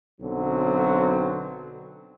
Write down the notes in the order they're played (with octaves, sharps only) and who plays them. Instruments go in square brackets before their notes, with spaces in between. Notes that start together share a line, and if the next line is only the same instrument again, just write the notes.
[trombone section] B1 D3 F#3 C4